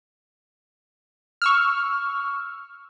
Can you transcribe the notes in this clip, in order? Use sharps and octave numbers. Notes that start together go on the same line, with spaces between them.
C#6 E6 F6